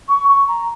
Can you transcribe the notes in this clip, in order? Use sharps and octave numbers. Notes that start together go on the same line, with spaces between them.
C#6
C#6
A#5